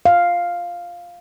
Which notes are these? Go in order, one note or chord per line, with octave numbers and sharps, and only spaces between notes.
F5